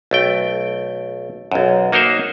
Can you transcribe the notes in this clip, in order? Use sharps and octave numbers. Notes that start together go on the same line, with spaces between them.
B1 A3 G5
B1 F#2
A#3 D#4 F#4 A#4 C5 E5